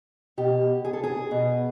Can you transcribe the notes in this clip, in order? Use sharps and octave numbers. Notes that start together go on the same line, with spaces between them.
B2 G4
G#4
A4
G#4
B2